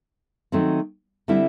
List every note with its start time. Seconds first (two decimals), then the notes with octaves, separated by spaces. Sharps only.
0.52 D#3 F#3 A3 C4
1.28 D3 G3 C4 E4